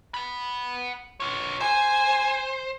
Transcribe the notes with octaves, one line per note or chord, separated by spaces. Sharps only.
F#5 B5
F4 C#5
C5 G#5